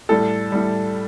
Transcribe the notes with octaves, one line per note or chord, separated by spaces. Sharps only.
A2 G3 A4
A2 G3